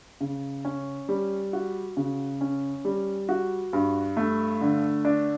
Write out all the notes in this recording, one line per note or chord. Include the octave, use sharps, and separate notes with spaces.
C#3
C#4
G3
F#4
C#3
C#4
G3
F#4
G2
A3
D3
D4